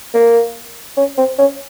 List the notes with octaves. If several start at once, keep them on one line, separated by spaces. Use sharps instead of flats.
A#3
C#4
C4
C#4